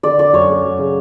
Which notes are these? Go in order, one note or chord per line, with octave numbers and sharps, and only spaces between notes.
D3 D5
D3 D5
F#2 C#5
A3
F#3
C#3